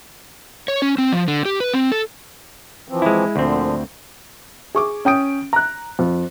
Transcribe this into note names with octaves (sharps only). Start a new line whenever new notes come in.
C#5
C#4
C4
F3
D3
G4
B4
C4
A4
E3 F3 C4
G#3 E4
D2 A#2 D3 F3 C4
G#4 C#6 D6
C#4 G5 D#6 D7
A#5 F#6
F2